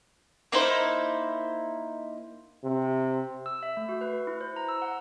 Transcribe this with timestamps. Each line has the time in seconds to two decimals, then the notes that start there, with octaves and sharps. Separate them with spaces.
0.52 A#3 D#4 E4 C5
2.64 C3
3.46 E6
3.63 E5
3.77 A3
3.89 F#4
4.01 B4
4.27 E4
4.41 C5
4.56 A#5
4.69 E6
4.82 F#5